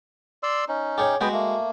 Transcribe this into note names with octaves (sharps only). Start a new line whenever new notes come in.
D5 C6 E6
C#4 D#4
G4 G#4 C#5
G#3 B3 F#4 G5
A3 A#3